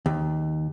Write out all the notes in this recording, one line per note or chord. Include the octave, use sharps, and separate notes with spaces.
D#2